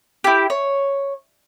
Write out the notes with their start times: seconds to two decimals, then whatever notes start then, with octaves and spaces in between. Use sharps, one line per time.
0.24 E4 G4
0.50 C#5